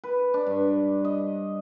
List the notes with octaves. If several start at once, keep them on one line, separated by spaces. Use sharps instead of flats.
B4
D4
G2
D#5